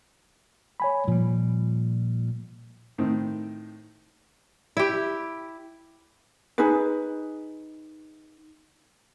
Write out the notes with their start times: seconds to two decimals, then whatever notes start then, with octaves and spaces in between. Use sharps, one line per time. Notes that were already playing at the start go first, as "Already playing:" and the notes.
0.80 C#5 G#5 B5
1.08 A#2 F3 G3
2.98 A2 D#3 C4
4.77 E4 G4
6.58 D#4 G#4 B4